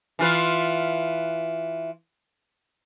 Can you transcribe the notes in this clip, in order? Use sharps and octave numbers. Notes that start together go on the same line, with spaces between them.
E3 F4 B4